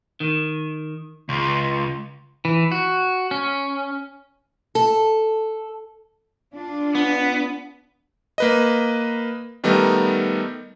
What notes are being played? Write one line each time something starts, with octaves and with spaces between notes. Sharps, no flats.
D#3
C#2
E3
F#4
C#4
A4
D4 F4
B3
A#3 B4 D#5
D#3 G3 A3 B3 D#4 A#4